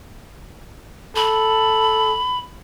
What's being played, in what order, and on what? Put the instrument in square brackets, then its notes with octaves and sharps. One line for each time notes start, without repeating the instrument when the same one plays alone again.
[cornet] A4 [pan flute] B5